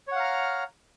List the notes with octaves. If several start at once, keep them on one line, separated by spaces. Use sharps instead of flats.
C#5 F5 F#5 A#5 F6